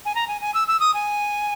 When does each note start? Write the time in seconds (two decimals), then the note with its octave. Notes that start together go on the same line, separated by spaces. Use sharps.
0.05 G#5
0.15 A#5
0.28 G#5
0.41 G#5
0.54 E6
0.68 E6
0.80 D#6
0.94 G#5